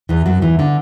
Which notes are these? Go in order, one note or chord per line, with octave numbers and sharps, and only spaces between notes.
E2 E3
F#2 F#3
E2 E3
D3